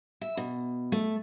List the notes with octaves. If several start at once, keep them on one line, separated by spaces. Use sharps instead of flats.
E5
B2
A3